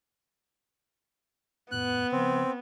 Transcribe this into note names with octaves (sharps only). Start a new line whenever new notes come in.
D#1 F2 A2 B3 F#6
C#3 F3 C4